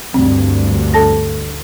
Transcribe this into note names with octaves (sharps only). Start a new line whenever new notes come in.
D2 G2 C4
A4 A5 A#6